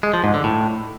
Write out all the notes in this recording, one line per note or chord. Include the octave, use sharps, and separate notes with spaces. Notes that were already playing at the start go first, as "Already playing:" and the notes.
G#3
F3
G#2
D3
A2